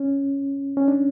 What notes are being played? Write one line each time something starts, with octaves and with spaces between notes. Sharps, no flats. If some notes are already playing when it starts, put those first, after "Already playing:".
Already playing: C#4
C#4
D4